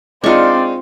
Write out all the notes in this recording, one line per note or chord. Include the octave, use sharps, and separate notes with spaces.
G#3 C4 D4 D#4 F4 D5 C#6